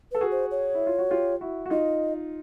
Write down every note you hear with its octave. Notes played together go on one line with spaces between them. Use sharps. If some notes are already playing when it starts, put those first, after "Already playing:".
A4 B4
F#4 G#4
C5
C#5
E4
F4
F#4
F4 G4
E4 F#4
F#4
D#4 F4 D#5